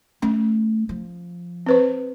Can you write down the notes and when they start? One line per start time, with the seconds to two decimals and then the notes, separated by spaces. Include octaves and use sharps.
0.22 A3 C#4
0.89 F3
1.67 C4 B4 C5